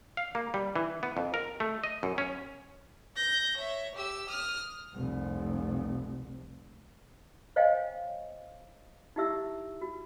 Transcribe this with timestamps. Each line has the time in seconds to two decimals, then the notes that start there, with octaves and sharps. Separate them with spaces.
0.17 F5
0.35 A#3
0.54 G3
0.76 E3
1.03 B3
1.17 F2
1.34 A#4
1.60 A3
1.84 D#5
2.03 F#2
2.18 C#4
3.17 G6 A#6
3.56 C#5 E5
3.95 G4 E6
4.29 D#6 F6
4.94 F1 C2
7.56 C5 C#5 D#5 F5 G5 G#5
9.16 D#4 E4 G4 E5 E6
9.81 F#4